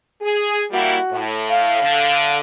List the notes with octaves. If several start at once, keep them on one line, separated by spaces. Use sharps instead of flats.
G#4
G3 A#3 E4 F#4
A2
F5
D3